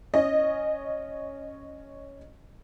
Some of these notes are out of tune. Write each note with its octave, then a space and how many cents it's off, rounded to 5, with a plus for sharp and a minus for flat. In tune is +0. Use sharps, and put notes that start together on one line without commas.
C#4 +0 D#5 -10